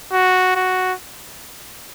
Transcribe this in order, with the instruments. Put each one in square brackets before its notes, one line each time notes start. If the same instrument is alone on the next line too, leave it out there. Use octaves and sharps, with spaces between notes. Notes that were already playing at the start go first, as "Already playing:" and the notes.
[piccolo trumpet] F#4
F#4